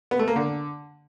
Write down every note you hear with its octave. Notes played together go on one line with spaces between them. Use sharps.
B3
A3
A#3
D3